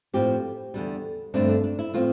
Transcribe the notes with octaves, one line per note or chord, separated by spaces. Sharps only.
A2 F3 C4 G4
E2 D3 G3
G2 D3 A3 C4 D4
D4
D4
E4
A2 F3 C4 F4